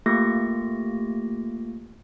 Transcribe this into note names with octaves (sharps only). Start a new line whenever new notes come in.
A3 A#3 F4 G4 C#6 A#6